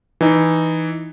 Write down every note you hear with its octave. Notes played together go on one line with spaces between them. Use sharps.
E3 D#4